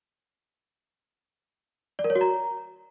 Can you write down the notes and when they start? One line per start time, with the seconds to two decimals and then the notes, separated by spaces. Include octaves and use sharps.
1.99 D5
2.04 A#4
2.10 C#5
2.15 F#4
2.21 A#5